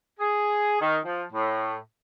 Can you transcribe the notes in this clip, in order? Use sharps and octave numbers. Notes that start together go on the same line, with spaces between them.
G#4
D#3
F3
A2